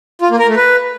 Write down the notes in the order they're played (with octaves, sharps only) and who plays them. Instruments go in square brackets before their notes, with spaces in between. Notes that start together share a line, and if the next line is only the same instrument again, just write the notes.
[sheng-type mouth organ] F4
A#3
A#4
A3
B4